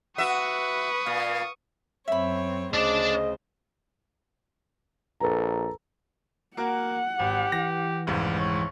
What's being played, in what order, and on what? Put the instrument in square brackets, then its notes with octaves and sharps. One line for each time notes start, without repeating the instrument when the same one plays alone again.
[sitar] F#4 E5 [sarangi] B4 [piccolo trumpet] F#5 [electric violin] C#6 D#6
[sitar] A#2 [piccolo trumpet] F5
[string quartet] F#2 C4 C#5 [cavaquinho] E5 B5
[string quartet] D2 C#3 C5 [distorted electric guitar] D4 D5 [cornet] D#5
[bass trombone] A#1 [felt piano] A4 B4 A#5
[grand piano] A#3 F#4 A#4 [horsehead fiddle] F#5
[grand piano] G#1 [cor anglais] G4
[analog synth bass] E3 [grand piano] A#6
[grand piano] F1 C#2 G#2 [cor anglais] G3
[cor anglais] C#5